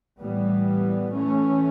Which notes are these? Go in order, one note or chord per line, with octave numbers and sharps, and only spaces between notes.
A2 E3 G3 B3
E3 A3 C#4